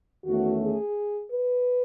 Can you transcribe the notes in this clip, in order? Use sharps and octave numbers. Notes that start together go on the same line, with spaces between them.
E2 D#3 A3 C#4 F#4
G#4
B4